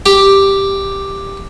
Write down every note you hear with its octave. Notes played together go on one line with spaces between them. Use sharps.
G4